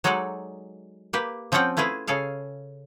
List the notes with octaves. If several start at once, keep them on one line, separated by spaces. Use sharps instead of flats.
F#3 G#3 D#4 A4 D5 F#5
A#3 G4 B4
F3 C4 C#4 F4 F#5 G5
A3 E4 F4 G#4 B4
C#3 G#4 A4 F5